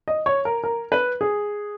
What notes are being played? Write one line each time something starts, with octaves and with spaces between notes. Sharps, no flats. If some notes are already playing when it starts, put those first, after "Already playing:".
D#5
C#5
A#4
A#4
B4
G#4